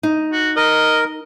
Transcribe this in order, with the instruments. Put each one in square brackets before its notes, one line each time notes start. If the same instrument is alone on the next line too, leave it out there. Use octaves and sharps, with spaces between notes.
[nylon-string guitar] D#4
[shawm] F#4
[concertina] A#4 [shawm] D#5